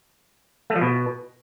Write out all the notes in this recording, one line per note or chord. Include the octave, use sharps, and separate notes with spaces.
A3
F3
B2